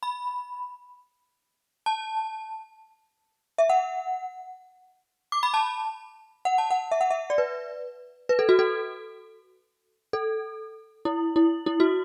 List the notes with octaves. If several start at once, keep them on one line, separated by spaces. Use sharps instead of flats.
B5
A5
E5
F#5
D6
B5
A5
F#5
A5
F#5
E5
F#5
E5
D5
B4
B4
A4
F#4
A4
A4
E4
E4
E4
F#4